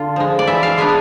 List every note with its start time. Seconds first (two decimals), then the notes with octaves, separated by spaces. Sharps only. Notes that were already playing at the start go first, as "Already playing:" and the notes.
Already playing: D3 F4
0.16 F3 G#3
0.39 D5
0.47 E3 E5
0.63 F5
0.78 G#3 B3 D4 G#5